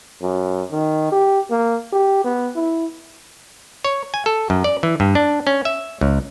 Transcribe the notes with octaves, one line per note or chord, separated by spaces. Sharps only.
F#2
D#3
G4
A#3
G4
B3
E4
C#5
G#5
A4
F#2
D5
E3
G2
D4
C#4
E5
C#2